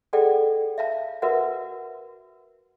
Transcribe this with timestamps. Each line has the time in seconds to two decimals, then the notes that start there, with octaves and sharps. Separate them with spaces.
0.13 G#4 A4 D5 F#5 G5
0.78 E5 F5 A5
1.22 F#4 A#4 B4 E5 F#5